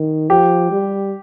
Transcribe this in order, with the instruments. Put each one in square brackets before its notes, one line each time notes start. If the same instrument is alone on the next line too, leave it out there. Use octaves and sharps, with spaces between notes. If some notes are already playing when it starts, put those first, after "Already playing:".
Already playing: [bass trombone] D#3
[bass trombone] F3 [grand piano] G4
[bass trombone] G3